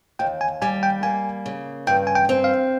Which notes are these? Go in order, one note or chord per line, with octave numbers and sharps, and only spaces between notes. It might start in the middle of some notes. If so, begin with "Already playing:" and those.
D#2 G5
G#5
G3 G#5
G5
A#3 G#5
C#3
G2 G5
G#5
G5
C4
F5